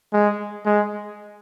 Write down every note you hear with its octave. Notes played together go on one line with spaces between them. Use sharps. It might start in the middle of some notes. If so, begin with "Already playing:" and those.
G#3
G#3